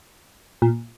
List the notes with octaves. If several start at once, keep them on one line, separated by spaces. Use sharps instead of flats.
A#2